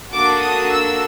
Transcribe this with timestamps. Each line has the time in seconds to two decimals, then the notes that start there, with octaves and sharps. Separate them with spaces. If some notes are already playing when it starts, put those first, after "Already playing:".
0.12 A#3 D4 F#4 A4 D6
0.39 D#6
0.68 E6